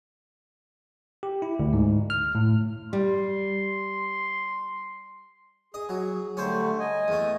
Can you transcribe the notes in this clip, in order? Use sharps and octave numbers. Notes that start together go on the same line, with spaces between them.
G4
E4
D2
G#2
F6
A2
G3 C6
G#4 D#5
F#3
D3 G3 A3 C#4 C5
D#5 G#5
E2 A3